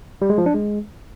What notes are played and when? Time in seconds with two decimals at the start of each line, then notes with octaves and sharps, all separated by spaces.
0.22 G3
0.30 G#3
0.38 F3
0.46 D4
0.54 G#3